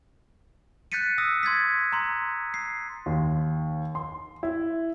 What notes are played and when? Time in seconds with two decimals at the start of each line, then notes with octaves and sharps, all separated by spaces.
0.92 F#6 G6 A6 B6 C#7 D#7
1.18 D#6 E6 A#6
1.43 C6 G#6 A6 B6
1.92 A#5 C6
2.54 C7
3.06 D#2
3.95 C6
4.43 E4